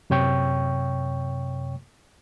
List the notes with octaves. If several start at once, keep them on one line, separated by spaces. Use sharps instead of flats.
F#2 C3 C#5 G5 C#6